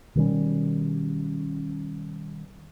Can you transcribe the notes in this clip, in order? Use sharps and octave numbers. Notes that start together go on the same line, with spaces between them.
B2 D#3 G3 C#4